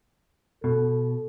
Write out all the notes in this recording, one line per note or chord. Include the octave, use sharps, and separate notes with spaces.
B2 A4